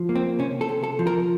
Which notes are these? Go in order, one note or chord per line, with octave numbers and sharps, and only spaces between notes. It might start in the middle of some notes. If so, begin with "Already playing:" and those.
Already playing: F3
A#3
C4
C3 C#4
A4
C3
A4
F3
A#4